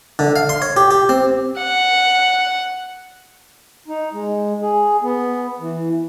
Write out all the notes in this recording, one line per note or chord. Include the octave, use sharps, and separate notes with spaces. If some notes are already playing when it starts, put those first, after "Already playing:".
D3
F5
C6
C#5
G4
G4
C4
F#5
D#4
G#3
G#4
B3
E3